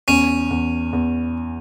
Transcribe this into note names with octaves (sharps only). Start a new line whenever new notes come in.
E2 C#4
E2
E2